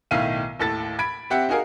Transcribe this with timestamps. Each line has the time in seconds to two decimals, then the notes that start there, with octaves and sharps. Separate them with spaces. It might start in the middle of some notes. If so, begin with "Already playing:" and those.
0.11 B1 A2 D#3 E5 F5 D#7
0.59 D#2 A2 A4 A6
0.99 B5 G#6 D7
1.30 C4 G4 E5 F#5 G5
1.49 D#4 F#4 G#4 A#4 F5